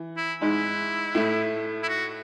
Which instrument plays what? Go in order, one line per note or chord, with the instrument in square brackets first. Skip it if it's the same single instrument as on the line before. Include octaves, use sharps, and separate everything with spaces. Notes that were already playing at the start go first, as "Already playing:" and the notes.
Already playing: [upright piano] E3
[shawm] E4
[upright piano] G#2 G#3 [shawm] E4
[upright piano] A2 A3
[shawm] E4
F#4